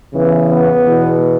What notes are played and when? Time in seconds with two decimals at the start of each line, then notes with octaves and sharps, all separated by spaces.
0.13 E2 C#3 E3
0.49 B3
0.85 E2 B2